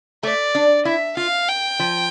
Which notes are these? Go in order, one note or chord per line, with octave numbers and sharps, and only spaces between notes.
A3 D5
D4
E4 E5
F4 F5
G5
F3